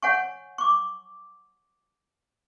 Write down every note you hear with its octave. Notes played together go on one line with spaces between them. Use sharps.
C#5 F#5 G#5 C#6
C#6 D6